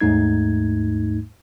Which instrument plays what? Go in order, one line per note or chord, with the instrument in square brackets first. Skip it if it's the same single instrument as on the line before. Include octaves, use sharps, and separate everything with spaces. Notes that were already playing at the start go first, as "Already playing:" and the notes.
[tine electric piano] D#2 G#2 A3 D#4 G#6